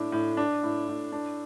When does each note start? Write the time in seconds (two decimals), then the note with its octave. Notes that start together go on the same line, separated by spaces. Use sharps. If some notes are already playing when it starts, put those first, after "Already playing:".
Already playing: A2 D4
0.12 A2
0.37 D4
0.63 A2
0.88 A2
1.12 D4